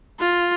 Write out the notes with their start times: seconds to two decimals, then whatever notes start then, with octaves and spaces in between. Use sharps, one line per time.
0.20 F4